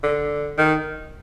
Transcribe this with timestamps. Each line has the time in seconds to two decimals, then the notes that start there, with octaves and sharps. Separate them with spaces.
0.03 D3
0.58 D#3